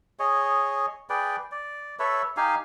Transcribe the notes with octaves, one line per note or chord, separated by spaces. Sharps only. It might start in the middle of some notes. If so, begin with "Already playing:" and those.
G#4 C#5 D#5
G#4 B4 D5 G5
D5
A4 B4 C#5 E5
D#4 G4 F5 G#5